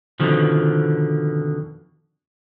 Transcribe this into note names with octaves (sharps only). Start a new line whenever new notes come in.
F2 B2 D3 D#3 F3